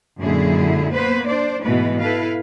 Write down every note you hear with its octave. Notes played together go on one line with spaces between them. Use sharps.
F#2 A#2 D3 G#3 E4 G#4
A#3 B3 B4 C5
D4 C5 D5
G#2 B2 E3 G#3 A3 B4
E4 A4 B4 F5